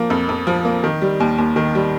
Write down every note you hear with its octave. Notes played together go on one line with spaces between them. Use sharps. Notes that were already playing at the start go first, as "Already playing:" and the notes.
Already playing: F3 A#3
F2
F2
F3
A#3
D#3
G3
D#2
D#2
D#3
G3